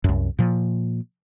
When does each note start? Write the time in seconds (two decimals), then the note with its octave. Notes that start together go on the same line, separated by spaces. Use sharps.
0.04 C2 F#2
0.39 A#2 F3